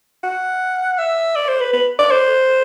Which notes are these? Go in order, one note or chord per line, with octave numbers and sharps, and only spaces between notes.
F#5
E5
D5
C5
B4
B4
D5
C5